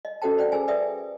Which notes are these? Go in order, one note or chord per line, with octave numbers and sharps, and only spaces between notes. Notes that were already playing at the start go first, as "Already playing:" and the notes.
D#5
C#4 F#4 A4 C5 G5 A5
C5 D5 F#5 G5
G#4 A#4 C5 G#5
B4 D5 E5 G5 D#6